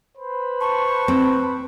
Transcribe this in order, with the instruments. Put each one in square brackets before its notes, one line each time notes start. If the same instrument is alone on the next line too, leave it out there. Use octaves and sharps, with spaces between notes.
[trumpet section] B4 C5 B5
[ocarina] A5 [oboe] C#6
[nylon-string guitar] C4